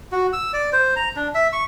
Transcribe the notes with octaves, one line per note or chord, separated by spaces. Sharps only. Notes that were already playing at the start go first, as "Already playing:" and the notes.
F#4
E6
D5
C5
A#5
D4
E5
C#6